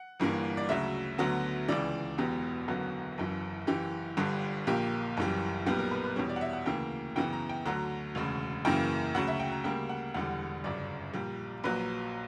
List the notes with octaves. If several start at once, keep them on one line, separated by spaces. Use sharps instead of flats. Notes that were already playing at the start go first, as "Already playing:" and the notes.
Already playing: F#5
G1 G2 E3 A#3
D5
D2 C#3 F#3 E5
D2 D3 F#3 B3
C#2 C#3 E3 D5
E1 E2 B2 F#3 B3 G4
F#1 F#2 D3 F#3 B3
F#1 F#2 E3
F#1 F#2 E3 G4
G1 G2 D3 G3
A#1 A#2 A#3 G4
F#1 F#2 E3 G3
B1 A#2 G3 B3 G4
A#4
B4
B4
E2 B2 G3 C#5
D5
F#5
E5
F#5
D2 C#3 E3 A#3 G5
F#2 C#3 E3 B3 G5
A#5
G5
D2 D3 F#3 A#5
E1 D2 C#3
F#2 C#3 E3 A#3 G5
D2 C#3 F#3 F#5
E5
G5
A#5
D2 C#3 G3 A#3 G5
F#5
E1 E2 D3 G3 F#5
G1 F#2 C#3 D5
A#1 A#2 G3
A#1 A#2 F#3 B4